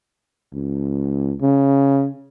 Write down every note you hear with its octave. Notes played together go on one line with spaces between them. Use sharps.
C#2
C#3